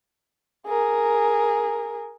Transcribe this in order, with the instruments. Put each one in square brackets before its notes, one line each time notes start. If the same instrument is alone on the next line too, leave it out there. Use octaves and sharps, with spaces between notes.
[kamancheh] G#4 A#4